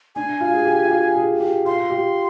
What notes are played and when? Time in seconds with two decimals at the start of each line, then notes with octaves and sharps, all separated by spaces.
0.15 D4 G#5
0.41 F4
0.53 G#4
0.65 G4
0.85 F4
0.91 G4
1.16 G#4
1.40 G4
1.65 F4 C6
1.90 G4